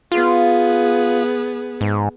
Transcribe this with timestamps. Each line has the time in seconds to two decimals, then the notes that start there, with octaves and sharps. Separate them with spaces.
0.12 B3 F4 G#4
1.81 G#2